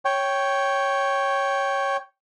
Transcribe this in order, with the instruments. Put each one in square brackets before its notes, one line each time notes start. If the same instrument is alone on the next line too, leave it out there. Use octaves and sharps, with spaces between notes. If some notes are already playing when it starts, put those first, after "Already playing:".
[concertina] C#5 G5